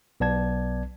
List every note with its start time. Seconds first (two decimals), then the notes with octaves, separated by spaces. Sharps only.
0.20 B1 B3 D5 A5 G#6